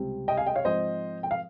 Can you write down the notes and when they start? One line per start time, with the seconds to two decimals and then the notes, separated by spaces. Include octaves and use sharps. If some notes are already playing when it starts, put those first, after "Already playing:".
Already playing: C#2 C3 G3 C4
0.28 D#5 G5
0.37 F5 G#5
0.46 D#5 G5
0.56 C#5 F5
0.65 G#2 F3 C4 C5 D#5
1.23 G5
1.31 F5